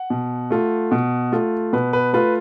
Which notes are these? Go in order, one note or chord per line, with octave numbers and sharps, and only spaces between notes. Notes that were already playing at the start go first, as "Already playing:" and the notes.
Already playing: F#5
B2
A3 F4
B2
A3 F4
B2 B4
B4
A3 F4 B4